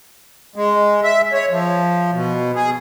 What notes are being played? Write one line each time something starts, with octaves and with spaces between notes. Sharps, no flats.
G#3
E5
C#5
F3
B2
G#4